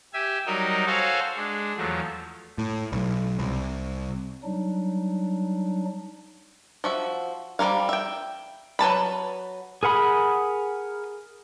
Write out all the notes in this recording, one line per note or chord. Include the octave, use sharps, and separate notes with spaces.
G4 E5 G#5
F#3 G3 D#4 A#4 D#5
F#4 A4 C5 C#5 F5 G#5
G#3 D4
E2 F3 F#3 A3
A2
B1
C2
F#3 G3 D4 D#4
F3 F#4 E5
F3 G3 C#4 A#4 F5
E5 G5
F#3 B4 A5 B5
G#4 A#4 F#5 B5 D#6